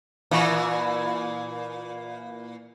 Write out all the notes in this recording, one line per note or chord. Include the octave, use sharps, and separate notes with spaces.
A#2 E3